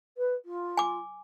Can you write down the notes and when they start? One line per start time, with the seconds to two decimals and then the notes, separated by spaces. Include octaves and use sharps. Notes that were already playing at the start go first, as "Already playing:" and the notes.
0.17 B4
0.45 F4
0.77 G#5 D6